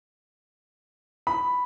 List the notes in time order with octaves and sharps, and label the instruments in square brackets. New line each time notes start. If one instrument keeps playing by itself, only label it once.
[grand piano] B5